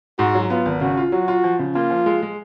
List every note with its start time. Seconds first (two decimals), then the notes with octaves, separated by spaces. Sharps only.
0.19 G#2 F#4
0.35 F#3
0.50 B3 F4
0.66 G#1
0.81 C#3 F#4
0.97 F4
1.12 F#3 F#4
1.28 F4
1.44 F3
1.59 C#3
1.75 A#3 F4
1.90 F3
2.06 G#3
2.22 G#3